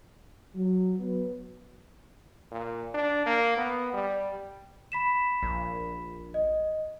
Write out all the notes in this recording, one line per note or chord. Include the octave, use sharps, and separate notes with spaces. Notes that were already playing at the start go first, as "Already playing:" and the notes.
F#3
F#3 B3 B4
A#2
D4
A#3
B3
G3
B5 B6 E7
A#1
D#5